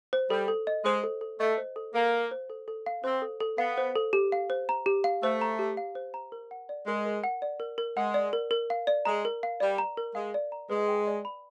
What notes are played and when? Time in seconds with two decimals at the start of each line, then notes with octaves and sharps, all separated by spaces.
0.13 C5
0.30 G3 A4
0.48 A4
0.67 D#5
0.85 G#3 C5
1.04 A4
1.21 A4
1.39 A3 D#5
1.58 C5
1.76 A4
1.94 A#3 A4
2.13 F5
2.31 C5
2.50 A4
2.68 A4
2.86 F5
3.04 C4 C5
3.22 A4
3.40 A4
3.58 B3 F5
3.78 C5
3.96 A4
4.13 G4
4.32 F5
4.50 C5
4.69 A#5
4.86 G4
5.04 F5
5.23 A3 C5
5.41 A#5
5.59 G4
5.77 F5
5.95 C5
6.14 A#5
6.32 A#4
6.51 F#5
6.69 D5
6.87 G#3 A#4
7.05 A#4
7.24 F#5
7.42 D5
7.60 A#4
7.78 A#4
7.97 G#3 F#5
8.14 D5
8.33 A#4
8.51 A#4
8.70 F5
8.87 D5
9.05 G#3 A#5
9.25 A#4
9.43 F5
9.60 G3 D5
9.78 A#5
9.97 A#4
10.15 G#3 F5
10.34 D5
10.52 A#5
10.70 G#3 B4
10.88 G5
11.07 D5
11.25 B5